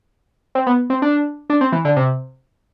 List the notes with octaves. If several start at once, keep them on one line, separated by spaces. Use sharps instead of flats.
C4
B3
C4
D4
D4
C4
E3
D3
C3